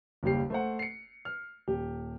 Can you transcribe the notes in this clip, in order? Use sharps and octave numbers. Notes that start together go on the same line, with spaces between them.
F#1 D#2 G3 G4 C7
A3 C5 F#5
C7 C#7
F6
D#1 G4